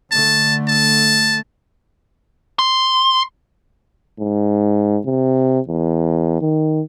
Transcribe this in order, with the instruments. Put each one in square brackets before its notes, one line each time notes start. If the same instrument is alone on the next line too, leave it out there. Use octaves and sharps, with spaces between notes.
[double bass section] D3 A3 [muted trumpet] A5
[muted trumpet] A5
[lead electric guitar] C6
[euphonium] G#2
C3
E2
D#3